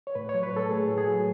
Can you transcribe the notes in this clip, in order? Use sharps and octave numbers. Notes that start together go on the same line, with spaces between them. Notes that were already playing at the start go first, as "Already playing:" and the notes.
C#5
A2 B4
C#5
F#3
B4
A2 A4
A3 G#4
A2
G#4
F#3